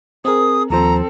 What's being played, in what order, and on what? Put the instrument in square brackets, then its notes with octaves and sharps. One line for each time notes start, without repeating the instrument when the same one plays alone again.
[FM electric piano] C4 A#4 [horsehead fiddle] G#4 [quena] D#6
[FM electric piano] D#2 F3 C5 [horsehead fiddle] C4 A4 [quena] A#5